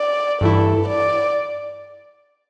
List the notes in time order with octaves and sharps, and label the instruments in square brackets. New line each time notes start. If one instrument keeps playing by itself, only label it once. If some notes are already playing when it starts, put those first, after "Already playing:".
Already playing: [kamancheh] D5
[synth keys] G2 E3 A3 E4 [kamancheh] A4
[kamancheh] D5